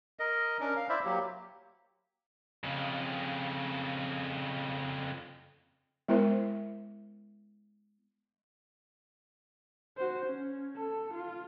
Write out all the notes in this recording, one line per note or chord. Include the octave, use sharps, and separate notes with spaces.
A#4 D#5
C#4 D4 A#4
F5
E4 C5 D5 E5
F#3 A#3 G4
F2 C#3
G#3 B3 E4 A#4 C5 E5
F#4 C5
C#4
A4
F4